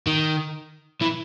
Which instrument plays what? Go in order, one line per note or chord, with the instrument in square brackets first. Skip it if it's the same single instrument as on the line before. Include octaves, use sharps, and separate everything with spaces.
[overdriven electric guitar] D#3
E3